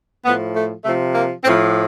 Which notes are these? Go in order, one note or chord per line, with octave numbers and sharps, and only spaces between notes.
A2 F3 B3
A3
C3 F3 A3
A#3
A2 F3 C4